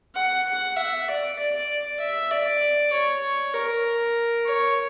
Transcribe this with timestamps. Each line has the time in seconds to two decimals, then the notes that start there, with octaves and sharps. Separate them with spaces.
0.15 F#5
0.76 E5
1.08 D5
1.39 D5
1.70 D5
2.00 E5
2.31 D5
2.92 C#5
3.54 A#4
4.46 C#5